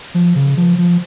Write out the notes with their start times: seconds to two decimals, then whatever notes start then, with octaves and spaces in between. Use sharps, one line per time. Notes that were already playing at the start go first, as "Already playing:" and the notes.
0.14 F3
0.35 C#3
0.57 F3
0.78 F3